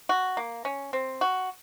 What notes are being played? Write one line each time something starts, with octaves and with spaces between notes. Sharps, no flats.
F#4
A#3
C#4
C4
F#4